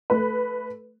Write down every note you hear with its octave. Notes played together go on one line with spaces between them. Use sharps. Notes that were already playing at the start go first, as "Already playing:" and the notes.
A3 B4